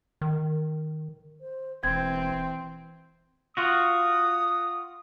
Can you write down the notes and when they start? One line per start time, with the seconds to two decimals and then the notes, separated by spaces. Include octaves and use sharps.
0.21 D#3
1.41 C5
1.83 E1 E3 C4 G#6
3.57 F4 F#4 D#6